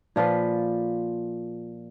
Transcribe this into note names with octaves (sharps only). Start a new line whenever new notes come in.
A#2 F3 F4 B4